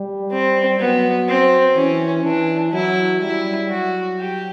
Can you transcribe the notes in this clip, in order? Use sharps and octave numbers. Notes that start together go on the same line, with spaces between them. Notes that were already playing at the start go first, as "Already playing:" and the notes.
Already playing: G3
C4
F#3 B3
C4
E3 C#4
E3 D4
F#3 E4
G3 E4
F#3 F#4
G4